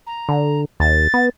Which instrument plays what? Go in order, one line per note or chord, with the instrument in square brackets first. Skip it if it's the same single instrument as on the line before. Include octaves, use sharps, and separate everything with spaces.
[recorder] A#5
[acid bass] D3
[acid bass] D#2 [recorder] A6
[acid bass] B3